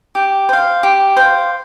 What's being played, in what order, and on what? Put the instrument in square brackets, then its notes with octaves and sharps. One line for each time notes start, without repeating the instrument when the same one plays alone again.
[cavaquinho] G4
C5 F5
G4
C5 F5